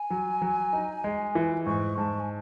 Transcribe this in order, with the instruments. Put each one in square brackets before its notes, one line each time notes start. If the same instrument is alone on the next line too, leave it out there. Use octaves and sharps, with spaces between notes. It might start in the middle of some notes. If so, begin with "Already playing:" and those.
Already playing: [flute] G#5
[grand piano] F#3
F#3
D#4
G#3
E3
[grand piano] G#2 [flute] C#6
[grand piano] G#2 [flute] A5
[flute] G#5